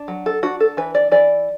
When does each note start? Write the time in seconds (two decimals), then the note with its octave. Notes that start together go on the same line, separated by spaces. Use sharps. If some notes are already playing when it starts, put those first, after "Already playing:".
Already playing: D4
0.08 F#3
0.26 A4
0.43 D4 F#4
0.60 A4
0.77 E3 B4
0.95 D5
1.12 E3 D5